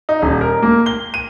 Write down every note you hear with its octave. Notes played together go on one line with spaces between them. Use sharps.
D#4
D#1
A#4
A#3
G7
D#7